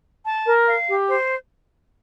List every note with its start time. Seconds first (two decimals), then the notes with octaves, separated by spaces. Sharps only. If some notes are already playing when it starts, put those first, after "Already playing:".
0.24 A5
0.46 A#4
0.66 F5
0.87 G4
1.08 C5